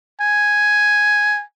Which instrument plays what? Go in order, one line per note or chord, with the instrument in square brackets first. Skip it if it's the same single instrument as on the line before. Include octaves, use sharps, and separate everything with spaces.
[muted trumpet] G#5